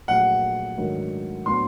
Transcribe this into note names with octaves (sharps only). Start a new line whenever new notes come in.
A#1 A#2 F#3 A3 F#5
G#2 D#3 F#3 A3 D4
A2 F#3 B3 D4 C6